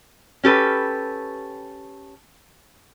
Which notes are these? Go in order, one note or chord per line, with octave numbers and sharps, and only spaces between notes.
C#4 G4 A4 B4